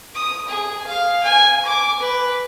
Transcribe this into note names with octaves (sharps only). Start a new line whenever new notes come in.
D#6
G#4
F5
G#5
D6
B4